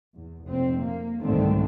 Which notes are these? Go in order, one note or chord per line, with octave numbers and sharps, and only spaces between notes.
E2
F1 C4
A#3
C2 G#2 D3 D#3 A3 C4